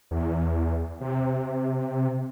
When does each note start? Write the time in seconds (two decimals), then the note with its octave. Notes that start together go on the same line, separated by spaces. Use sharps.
0.11 E2
1.01 C3